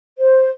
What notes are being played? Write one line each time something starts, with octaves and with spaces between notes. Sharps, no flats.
C5